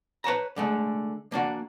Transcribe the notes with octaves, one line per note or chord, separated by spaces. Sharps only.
B4 C#5 A5 A#5
D3 G#3 A3
A#3 D4 F#4